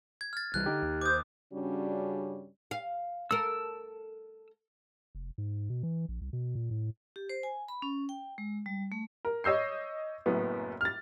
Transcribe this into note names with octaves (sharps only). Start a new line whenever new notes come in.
G#6
F6 A6
C2 E3 G3 F#6
D3 D#4 G4
D#2
C5 D6 D#6 G6
G2 C#3 G3 C#4 D4 F#4
F5
A4 A#4 E6
F1
G#2
B2
E3
A#1
C2
B2
A#2
A2
G4
C5
G#5
B5
C#4
G5
G#3
G3
A3
A#4
C#5 D#5 E6 G6 C7
F#1 F#2 A2 B3
F6 A6